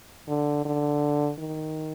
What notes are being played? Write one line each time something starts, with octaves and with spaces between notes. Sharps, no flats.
D3
D3
D#3